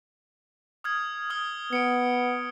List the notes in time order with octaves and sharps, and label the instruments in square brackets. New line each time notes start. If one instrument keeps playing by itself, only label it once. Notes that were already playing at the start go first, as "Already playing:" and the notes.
[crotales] D#6 F6 G#6
D#6 F6 G7
[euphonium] B3 [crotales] C#7 D7